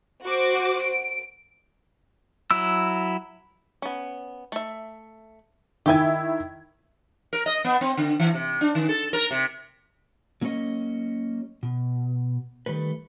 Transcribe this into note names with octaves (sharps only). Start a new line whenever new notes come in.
F#4 C5 D6
D7
F#3 E4 E6
B3 C#4
A3 E5
D#3 E4 G4 G5 G#5 G#6
A#4
D#5
B3
C4
D3
E3
C3
D4
D#3
A4
A#4
C3
F#3 A#3 C#4 G#4 C#5 D#5
B2
D#3 G3 A3 B4